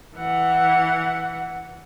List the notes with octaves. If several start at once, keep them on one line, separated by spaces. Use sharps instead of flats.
E3 F#5